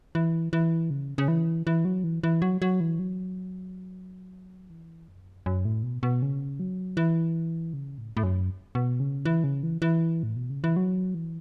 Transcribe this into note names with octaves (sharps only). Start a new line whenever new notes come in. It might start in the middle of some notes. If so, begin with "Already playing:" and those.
E3
E3
C#3
C#3
E3
E3
F#3
E3
E3
F#3
F#3
E3
F#3
E3
F#2
F#2
A2
B2
B2
C#3
F#3
E3
C#3
A2
A2
F#2
B2
C#3
E3
C#3
E3
E3
A2
B2
C#3
E3
F#3
E3